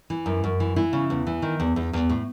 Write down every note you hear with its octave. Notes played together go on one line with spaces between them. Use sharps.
E3
F#2
F#2
E3
E3 E4
C#3
E2
E3
D#3
E2
E2
E2
A2